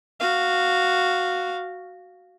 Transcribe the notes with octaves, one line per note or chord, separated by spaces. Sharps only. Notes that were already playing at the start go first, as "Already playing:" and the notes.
F#4 F5